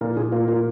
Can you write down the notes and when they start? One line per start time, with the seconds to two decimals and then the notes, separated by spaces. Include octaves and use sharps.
0.01 A#2 A#4
0.17 A#2 G#4
0.32 A#3 F4
0.48 F4 A#4